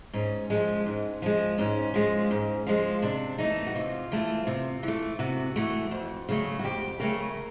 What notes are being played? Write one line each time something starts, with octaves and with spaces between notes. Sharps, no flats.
G#2 C#4
F3 G#3
G#2
F3 G#3
G#2 C#4
F3 G#3
G#2
F3 G#3
C3 D4
E3 A3 D#4
F#4
C3 F4
E3 A3
C3
E3
A3
C3 F#4
E3 A3
F2
C#3 F#3 A3
F#4
F2 G4
C#3 F#3 A3 A#4